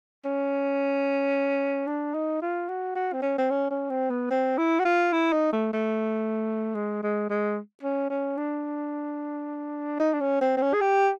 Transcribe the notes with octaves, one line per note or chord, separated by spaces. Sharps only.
C#4
D4
D#4
F4
F#4
F#4
C4
C#4
C4
C#4
C#4
C4
B3
C4
E4
F#4
F4
E4
D#4
A3
A3
G#3
G#3
G#3
C#4
C#4
D4
D#4
D4
C#4
C4
C4
C#4
G#4
G4